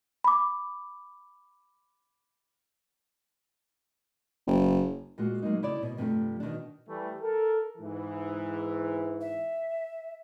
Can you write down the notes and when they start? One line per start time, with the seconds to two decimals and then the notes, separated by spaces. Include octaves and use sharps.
0.24 B5 D6
4.47 F#1
5.18 A#2 G#3 F4 F#4
5.42 F#3 G#3 A#3 D#4
5.62 C#3 E4 C#5 D5
5.83 B2
5.97 G2 C3 F3 G#3 A3 D4
6.40 B2 D#3 E3 D4
6.87 E3 G3 A3
7.21 A4 A#4
7.78 G#2 E3
9.21 E5